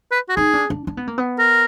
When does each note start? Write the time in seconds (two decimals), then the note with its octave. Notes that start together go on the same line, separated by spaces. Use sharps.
0.11 B4
0.29 F#4
0.36 D#4 G#4
0.54 D4
0.70 D4
0.87 D4
0.97 B3
1.07 A#3
1.18 B3
1.39 A#4